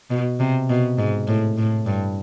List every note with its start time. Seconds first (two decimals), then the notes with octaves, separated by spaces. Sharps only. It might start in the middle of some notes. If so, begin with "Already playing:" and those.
0.10 B2
0.40 C3
0.70 B2
0.98 G#2
1.27 A2
1.57 A2
1.86 G2